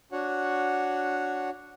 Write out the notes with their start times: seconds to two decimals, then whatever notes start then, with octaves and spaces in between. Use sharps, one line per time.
0.12 D4 F#4 C#5 F#5